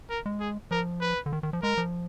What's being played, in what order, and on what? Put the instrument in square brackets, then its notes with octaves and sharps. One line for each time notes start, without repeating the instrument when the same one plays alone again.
[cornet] A#4
[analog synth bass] G#3
[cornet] G#4
[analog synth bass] F3 [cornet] A#4
[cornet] B4
[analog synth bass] D3
D#3
D#3
F3
[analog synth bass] G#3 [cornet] A#4
[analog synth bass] F3